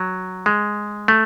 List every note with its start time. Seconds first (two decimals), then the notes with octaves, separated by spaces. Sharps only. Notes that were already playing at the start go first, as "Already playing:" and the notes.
Already playing: F#3
0.46 G#3
1.08 A3